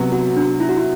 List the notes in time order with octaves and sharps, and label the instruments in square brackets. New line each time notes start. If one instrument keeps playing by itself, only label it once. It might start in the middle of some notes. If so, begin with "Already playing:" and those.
Already playing: [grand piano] C3 F#3 B3
[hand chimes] F#4
D4
E4
F#4
E4